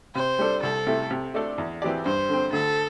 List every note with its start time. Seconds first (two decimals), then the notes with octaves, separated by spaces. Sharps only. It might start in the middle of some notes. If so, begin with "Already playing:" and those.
0.15 C3 C5
0.39 G3 D4 A4
0.63 C2 A4
0.87 C3 A3 E4
1.11 C3
1.34 A3 D4 A4 D5
1.58 E2
1.82 E3 C4 G4 D5
2.05 G2 C5
2.29 D3 C4
2.52 D2 A4